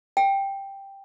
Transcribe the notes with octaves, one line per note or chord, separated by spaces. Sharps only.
G5